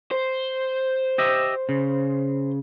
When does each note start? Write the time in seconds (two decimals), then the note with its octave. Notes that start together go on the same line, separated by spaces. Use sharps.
0.11 C5
1.18 G4 D#5 E5
1.69 C#3